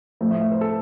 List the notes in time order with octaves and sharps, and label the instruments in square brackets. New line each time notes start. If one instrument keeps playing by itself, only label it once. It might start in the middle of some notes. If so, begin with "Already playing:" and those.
[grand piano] A2 F3 A3
E5
E5
C5
A4